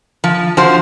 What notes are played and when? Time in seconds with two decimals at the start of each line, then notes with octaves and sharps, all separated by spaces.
0.24 F3
0.57 F3 F#4 C5